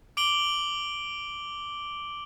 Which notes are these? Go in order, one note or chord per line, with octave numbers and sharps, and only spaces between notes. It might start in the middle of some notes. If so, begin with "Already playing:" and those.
D6 D7 F#7 G7